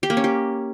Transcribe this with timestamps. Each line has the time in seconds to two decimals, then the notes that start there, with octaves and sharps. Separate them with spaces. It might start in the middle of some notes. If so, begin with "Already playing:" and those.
0.03 G4
0.10 A#3
0.17 C#4
0.24 G4